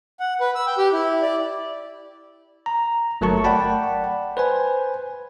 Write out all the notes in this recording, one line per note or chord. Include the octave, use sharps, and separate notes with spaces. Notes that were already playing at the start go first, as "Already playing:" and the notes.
F#5
B4
E6
G5
G4
E4
D5
A#5
G1 F#3 A3 A#4 A5 C#6
D5 F#5 G5 A5 B5
B4 C5 G#5